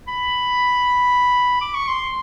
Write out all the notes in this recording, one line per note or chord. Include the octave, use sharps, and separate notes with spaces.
B5
D6
C#6
C6